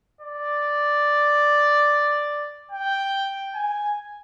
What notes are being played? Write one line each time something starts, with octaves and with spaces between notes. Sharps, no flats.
D5
G5
G#5